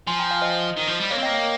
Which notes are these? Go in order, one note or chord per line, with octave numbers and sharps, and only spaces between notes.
F3 G#5 C6
G5 A#5
F5 G#5
C5 D#5
D#3
F3
G3
A#3 C#5 F5
C4
A#3 D#5 G5
C#5 F5